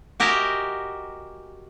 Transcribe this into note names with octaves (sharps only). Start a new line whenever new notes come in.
F#4 G4 A#4 D#5 E5 G#5